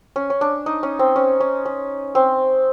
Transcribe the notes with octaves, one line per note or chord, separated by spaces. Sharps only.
C#4
C#4
D4
D#4
C#4
C4
C#4
C#4
C#4
C4